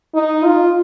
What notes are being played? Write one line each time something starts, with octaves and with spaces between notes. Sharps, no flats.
D#4
F4